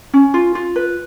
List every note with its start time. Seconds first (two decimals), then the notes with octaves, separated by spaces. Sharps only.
0.14 C#4
0.34 F4
0.55 F4
0.76 B4